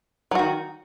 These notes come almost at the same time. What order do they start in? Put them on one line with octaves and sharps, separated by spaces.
F#3 F#4 D#3